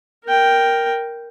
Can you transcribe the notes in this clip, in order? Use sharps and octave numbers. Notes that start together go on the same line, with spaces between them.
A#4 G5